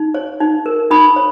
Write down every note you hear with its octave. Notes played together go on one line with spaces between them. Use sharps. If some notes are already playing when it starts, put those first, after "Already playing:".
Already playing: D#4
C#5
D#4
A#4
D#4 B5 D#6
C#5